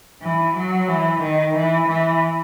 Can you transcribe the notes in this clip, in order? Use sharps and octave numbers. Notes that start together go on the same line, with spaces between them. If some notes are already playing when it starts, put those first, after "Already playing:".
E3
F#3
E3
D#3
E3
E3